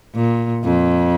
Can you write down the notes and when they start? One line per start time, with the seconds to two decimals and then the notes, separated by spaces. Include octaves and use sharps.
0.14 A#2
0.64 F2